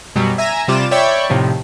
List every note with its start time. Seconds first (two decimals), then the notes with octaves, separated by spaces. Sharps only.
0.15 F#2 B2 F#3 G3
0.38 E5 G#5 A#5 A#6
0.68 C3 G3 F4 D6 E7
0.91 C#5 D5 E5 G5 B5 C#6
1.30 A2 C3 D#3 F3